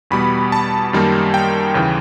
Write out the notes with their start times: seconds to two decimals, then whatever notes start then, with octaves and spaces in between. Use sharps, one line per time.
0.11 E2 B2 G3 B3 B5
0.52 A5
0.93 F#2 D#3 G3 A#3
1.34 G5
1.74 D#2 C#3 E3